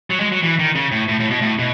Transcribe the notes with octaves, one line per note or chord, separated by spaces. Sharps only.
F#3
G#3
F#3
E3
D#3
C#3
A2
A2
A2
B2
A2
B2